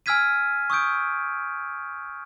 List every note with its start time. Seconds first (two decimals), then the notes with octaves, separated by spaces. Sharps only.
0.06 G#5 E6 F6 G#6 B6 D#7
0.70 C#6 D#6 E6 G6 D7